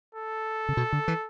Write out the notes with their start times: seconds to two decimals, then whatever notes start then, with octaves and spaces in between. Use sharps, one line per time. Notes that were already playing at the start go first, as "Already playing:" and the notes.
0.15 A4
0.69 C#3
0.77 B2
0.93 D3
1.08 E3